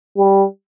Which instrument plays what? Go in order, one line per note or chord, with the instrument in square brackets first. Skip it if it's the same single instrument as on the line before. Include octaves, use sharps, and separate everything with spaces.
[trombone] G3